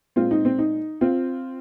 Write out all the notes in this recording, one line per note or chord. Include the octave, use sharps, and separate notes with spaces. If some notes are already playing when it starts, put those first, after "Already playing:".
A#2 G#3 C4 F4
D#4
C4
D#4
C4 F4